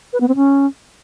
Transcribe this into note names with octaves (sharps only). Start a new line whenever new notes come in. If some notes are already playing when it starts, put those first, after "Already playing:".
B4
B3
C4
C#4